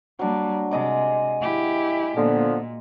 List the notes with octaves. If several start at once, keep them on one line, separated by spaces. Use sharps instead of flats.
F#3 G3 A#3 D4
C3 G#3 D#5 D6
E4 G4
A#2 D3 F3 B3